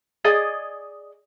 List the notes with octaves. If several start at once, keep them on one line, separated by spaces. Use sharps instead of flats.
G#4 D5 D#5 G#5